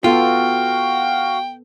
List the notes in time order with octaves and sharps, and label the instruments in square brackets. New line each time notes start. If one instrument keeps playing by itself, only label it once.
[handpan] B3 A4 [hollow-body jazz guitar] F4 [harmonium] F#4 F5 [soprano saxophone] G5